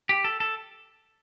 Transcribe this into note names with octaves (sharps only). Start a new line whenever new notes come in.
G4
A4
A4